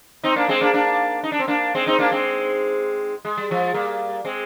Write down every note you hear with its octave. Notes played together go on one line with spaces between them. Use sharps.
C4 D#4
A#3 D4
G#3 C4
A#3 D4
A#3 D4
D#4
D4
C4
A#3 D4
G#3 C4
C4 D#4
A#3 D4
G#3 C4
G#3
G3
F3 G#3
G3 A#3
G#3 C4